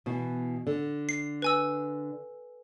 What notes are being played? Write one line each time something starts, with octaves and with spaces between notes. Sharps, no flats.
B2 E3
D3
C7
B4 G#5 E6